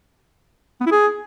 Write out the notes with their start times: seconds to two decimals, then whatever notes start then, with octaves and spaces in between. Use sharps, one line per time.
0.81 B3
0.86 E4
0.91 G#4